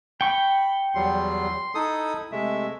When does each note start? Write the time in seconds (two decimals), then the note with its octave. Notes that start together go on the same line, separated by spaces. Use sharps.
0.21 G5 B5 C#6
0.95 E2 F#3 G3 C6
1.75 D#4 E4 A4 D#6
2.32 C3 G#3 A3 E5